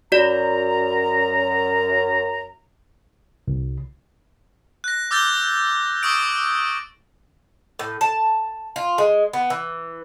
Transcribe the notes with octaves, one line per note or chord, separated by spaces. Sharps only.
F#2 F#4 D5 A#5
C2
F#6 A#6
D6 E6 G6 A6 G7
C#6 D#6 E6 D7
A2
A5
F4
G#3
B3
E3